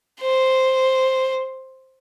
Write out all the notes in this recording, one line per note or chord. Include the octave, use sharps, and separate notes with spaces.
C5